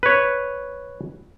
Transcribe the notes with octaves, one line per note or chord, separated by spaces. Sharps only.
B4 C#5